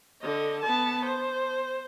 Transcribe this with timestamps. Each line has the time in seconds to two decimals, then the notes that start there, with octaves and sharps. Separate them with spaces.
0.22 D3 D#5
0.62 B3 A5
1.06 C5